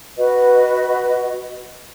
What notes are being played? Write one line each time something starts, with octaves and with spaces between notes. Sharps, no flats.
F#4 B4 D#5